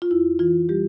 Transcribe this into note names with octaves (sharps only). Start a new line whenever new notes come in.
F4
F2 E4
E3 F4
G3 G4